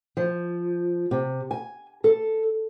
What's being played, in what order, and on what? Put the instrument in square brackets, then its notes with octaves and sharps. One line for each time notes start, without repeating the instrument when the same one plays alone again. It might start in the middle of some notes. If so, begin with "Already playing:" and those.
[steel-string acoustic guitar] F3
C3
G#5
A4